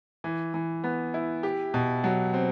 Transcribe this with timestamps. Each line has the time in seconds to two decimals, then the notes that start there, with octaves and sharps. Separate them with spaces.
0.24 E3
0.54 E3
0.84 B3
1.14 E4
1.43 G4
1.74 B2
2.04 F#3
2.34 C4